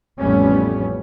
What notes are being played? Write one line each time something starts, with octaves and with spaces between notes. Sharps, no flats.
A1 F2 G3 A3 B3 C#4